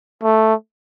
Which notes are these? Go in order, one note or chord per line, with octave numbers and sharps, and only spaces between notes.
A3